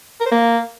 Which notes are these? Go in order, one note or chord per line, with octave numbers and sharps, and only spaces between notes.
A#4
C5
A#3